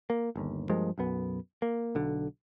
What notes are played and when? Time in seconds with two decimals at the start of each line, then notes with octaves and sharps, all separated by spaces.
0.10 A#3
0.36 G1 D#2
0.69 G2 F3 G#3 A#3
0.98 B1 F#2 B3
1.62 A#3
1.95 B1 D3